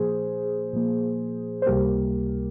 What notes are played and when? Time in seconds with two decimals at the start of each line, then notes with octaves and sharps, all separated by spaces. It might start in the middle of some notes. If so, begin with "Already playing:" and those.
Already playing: A#2 F3 A#3 G#4 C5
0.73 A#2 F3 A#3
1.62 C5
1.66 C#2 C3 G3 A#3 G4 A#4